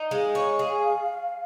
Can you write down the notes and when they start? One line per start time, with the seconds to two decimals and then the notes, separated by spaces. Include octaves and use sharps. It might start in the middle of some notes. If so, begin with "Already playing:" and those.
Already playing: D#4
0.11 G#3 F5
0.35 C#5
0.59 G#4